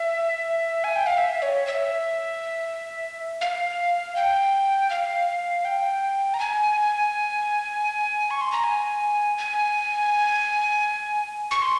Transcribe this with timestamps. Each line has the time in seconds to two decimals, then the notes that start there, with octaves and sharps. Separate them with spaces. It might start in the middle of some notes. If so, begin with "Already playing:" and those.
Already playing: E5
0.84 G#5
0.96 G5
1.06 F5
1.18 E5
1.42 C#5
1.67 E5
3.41 F5
4.16 G5
4.90 F5
5.65 G5
6.34 A#5
6.40 G#5
8.31 C#6
8.41 C6
8.52 A#5
8.64 G#5
9.38 G#5
11.51 C#6
11.62 C6